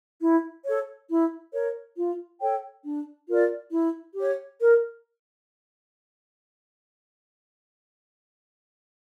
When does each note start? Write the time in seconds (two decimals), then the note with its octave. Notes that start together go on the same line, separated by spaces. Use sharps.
0.21 E4
0.64 A4 C#5
1.09 E4
1.53 A#4 C#5
1.96 F4
2.41 A4 C#5 G5
2.84 D4
3.28 F4 A#4 D5
3.72 E4
4.15 G4 C#5
4.59 A#4